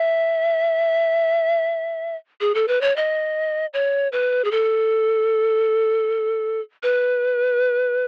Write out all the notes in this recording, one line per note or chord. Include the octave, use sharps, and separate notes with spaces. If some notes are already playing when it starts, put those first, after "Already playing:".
Already playing: E5
G#4
A4
B4
C#5
D#5
C#5
B4
G#4
A4
B4